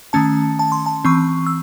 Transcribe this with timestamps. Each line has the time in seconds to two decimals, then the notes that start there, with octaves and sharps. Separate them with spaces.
0.13 D#3 A3 C#4 A5
0.59 A5
0.72 C6
0.86 A5
1.04 E3 C4 C#6
1.46 E6